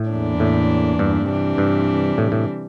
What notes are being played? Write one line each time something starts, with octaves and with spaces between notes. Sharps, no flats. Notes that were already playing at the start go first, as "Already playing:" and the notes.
Already playing: A2
E2 E3 A#3 D4
A2
G2
C3 E3 G3 D4
G2
A2
A2